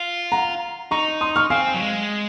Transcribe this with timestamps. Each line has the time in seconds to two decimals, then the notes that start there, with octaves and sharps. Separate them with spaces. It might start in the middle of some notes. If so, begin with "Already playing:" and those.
Already playing: F4
0.32 F#5 A#5
0.91 D#4 A#5 C#6
1.21 C6 D#6
1.36 C#6 F6
1.50 C4 F5 G#5
1.74 F#3
1.81 G#3